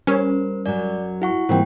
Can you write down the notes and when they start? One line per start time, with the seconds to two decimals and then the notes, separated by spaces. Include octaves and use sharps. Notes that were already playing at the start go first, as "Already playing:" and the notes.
0.07 G3 C#4 A#4 C5
0.66 F#2 F#3 D5
1.22 E4 F#4 F#5 C#6
1.49 G#2 E3 G3 A#3 C4 F4 G5